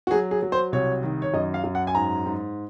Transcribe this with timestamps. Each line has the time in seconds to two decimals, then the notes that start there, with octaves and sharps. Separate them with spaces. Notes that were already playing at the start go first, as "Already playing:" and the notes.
0.07 F#4
0.11 F#3 G#4
0.31 G#4
0.43 F#3
0.52 C5
0.72 C2 C#5
1.03 D#3
1.22 C#5
1.34 F#2 D#5
1.54 F5
1.64 F#2
1.75 F#5
1.87 G#5
1.95 G#2 A#5
2.26 G#2